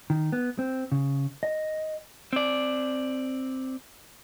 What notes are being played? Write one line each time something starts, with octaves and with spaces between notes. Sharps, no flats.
D#3
B3
C4
C#3
D#5
C4 D5